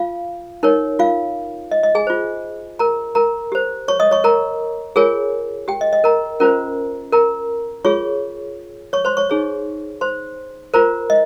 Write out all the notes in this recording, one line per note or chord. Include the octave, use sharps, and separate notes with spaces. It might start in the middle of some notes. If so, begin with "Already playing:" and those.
Already playing: F4 F5
D#4 A#4 C#5
F4 F5
D#5
D#5
G#4 G#5
F4 C5
A#4 A#5
A#4 A#5
G4 C5
C#5 C#6
D#5 D#6
C#5 C#6
A#4 A#5
F4 G#4 A#4 C#5 G#5
G4 G5
D#5
D#5
A#4 A#5
C#4 F4 A#4 C5 A#5
A#4 A#5
F4 G#4 C#5 C#6
C#5 C#6
C5 C6
C#5 C#6
D#4 G#4 C#5
C5 C6
F4 A#4 C5 A#5
D#5